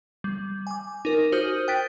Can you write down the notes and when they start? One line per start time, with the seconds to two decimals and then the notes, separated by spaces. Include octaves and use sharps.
0.24 G3
0.67 G#5 D6
1.05 D#4 A#4
1.32 F#4 C5 D#6 F6 G6 D#7
1.68 G5 F#6 A6 B6 D7